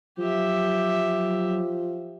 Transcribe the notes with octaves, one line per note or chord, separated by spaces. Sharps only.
F3 F#3 G4 E5